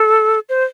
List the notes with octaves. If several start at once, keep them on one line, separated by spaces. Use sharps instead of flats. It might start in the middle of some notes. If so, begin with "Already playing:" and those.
Already playing: A4
C5